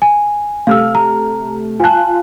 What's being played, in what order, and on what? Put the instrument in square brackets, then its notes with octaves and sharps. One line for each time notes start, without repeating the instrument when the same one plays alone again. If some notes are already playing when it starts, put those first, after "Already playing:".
[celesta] G#5
[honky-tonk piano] C3 A3 F6 [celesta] F5 E6
[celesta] A#5
[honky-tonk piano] F4 F#6 [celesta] G#5 A5